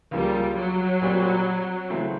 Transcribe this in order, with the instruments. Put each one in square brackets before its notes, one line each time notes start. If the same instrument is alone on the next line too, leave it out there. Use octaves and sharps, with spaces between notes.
[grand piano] C#2 C#3 F3 A#3 [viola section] G3
[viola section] F#3
[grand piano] A#2 G3 C4
C#3 E3 A3 C4